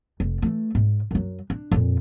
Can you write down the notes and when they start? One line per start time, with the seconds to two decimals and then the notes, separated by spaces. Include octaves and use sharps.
0.20 F1
0.42 E3 A3
0.75 G#2
1.11 F#2 F#3
1.50 D4
1.72 F2 A#2